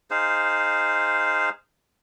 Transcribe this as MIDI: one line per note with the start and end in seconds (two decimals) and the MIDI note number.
0.11 1.50 63
0.11 1.50 68
0.11 1.50 72
0.11 1.50 77